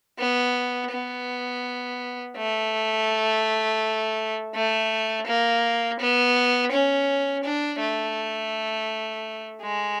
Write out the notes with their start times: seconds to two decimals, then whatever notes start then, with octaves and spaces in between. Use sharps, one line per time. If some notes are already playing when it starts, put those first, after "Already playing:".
0.19 B3
0.91 B3
2.37 A3
4.54 A3
5.26 A#3
6.00 B3
6.72 C#4
7.44 D4
7.80 A3
9.62 G#3